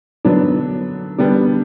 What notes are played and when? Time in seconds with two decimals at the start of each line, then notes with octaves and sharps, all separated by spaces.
0.25 D3 F#3 B3 D4
1.18 D3 G3 B3 D4